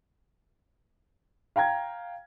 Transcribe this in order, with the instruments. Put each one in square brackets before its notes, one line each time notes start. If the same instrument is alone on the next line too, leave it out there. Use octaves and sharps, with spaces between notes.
[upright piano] F5 G5 A#5 G#6